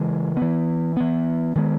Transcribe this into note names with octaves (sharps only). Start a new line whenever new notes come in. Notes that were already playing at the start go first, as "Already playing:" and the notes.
Already playing: C#3 E3 G#3
E3 B3
E3 B3
D#3 G#3 B3